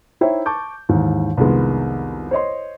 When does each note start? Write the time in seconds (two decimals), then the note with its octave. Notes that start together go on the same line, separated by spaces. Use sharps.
0.21 D#4 E4 C5 C#5 E5 G5
0.46 A5 C#6 D6 G6
0.89 D#2 G#2 E3
1.37 C2 F2 D#3 G#3 B3
2.31 C5 C#5 D#5 C6